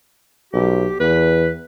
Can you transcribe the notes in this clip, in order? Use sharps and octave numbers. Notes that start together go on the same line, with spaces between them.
B1 G4
E2 B4